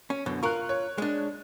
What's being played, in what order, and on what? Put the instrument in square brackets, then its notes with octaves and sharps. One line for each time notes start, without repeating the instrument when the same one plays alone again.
[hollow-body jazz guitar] C#4
[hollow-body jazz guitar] F#2 B2 [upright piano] D3
[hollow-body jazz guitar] F4 A#4 [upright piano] C#6 F#6
[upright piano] C#5
[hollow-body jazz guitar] G#3 D4